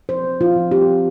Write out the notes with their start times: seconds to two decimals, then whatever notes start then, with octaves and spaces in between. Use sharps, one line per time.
0.09 F3 C5
0.25 C4
0.41 F3 F4
0.56 F3
0.71 C4 G4
0.87 F3